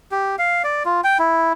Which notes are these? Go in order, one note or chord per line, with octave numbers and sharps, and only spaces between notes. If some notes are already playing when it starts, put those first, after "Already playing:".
G4
F5
D5
F4
G5
E4